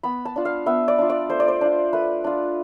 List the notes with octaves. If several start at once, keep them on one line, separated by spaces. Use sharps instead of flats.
B3 B5
A5
D4 F4
F5
B3 E5
D5
D4 F4
D5
A3 C5
D5
C5
D4 F4
A3 B4
D4 F4